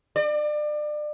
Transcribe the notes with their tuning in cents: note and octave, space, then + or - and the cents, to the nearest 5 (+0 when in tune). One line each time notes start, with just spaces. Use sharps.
D5 +30